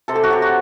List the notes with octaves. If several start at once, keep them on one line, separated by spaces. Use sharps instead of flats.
C3 A4
G4
F#4
F#3 G4
F#4